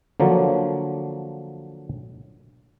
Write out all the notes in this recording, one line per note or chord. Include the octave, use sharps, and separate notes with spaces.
D3 F3 F#3 A#3